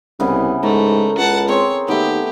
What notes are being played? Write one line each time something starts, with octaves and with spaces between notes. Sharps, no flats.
C2 C#3 E3 B3
G#2 A3 A#4
C#2 F#5 A5
C4 G#4 C#5
D#2 A3 B3 G4